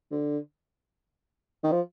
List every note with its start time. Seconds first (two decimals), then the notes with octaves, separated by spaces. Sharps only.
0.11 D3
1.63 D#3
1.72 F3